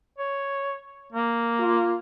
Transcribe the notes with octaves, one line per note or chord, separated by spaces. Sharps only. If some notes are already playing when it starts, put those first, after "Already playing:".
C#5
A#3
F4